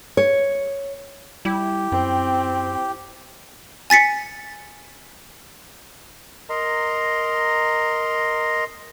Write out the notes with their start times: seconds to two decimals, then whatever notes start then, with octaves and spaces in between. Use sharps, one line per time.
0.17 C#5
1.45 G3 E4 G4
1.92 F#2 C4
3.90 G#5 A6 B6 C#7
6.49 A#4 D#5 A#5 C6